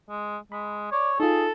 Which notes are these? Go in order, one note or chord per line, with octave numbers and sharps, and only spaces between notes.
G#3
G#3 B5
C#5 D5
D#4 F4 G#4 A4